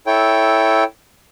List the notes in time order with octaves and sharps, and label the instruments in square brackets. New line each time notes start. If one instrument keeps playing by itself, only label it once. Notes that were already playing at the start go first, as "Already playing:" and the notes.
[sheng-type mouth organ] E4 A4 C#5 G5